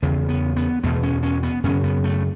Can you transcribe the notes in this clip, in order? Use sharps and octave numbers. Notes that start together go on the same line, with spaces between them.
E2 C#3 B3
B3
B3
E2 B2 A3
C#4
C#4
B3
F#2 C#3 C#4
B3
A3